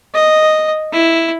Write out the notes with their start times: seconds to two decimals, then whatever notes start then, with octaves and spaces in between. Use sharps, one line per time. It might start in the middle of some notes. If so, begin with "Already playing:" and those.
0.14 D#5
0.92 E4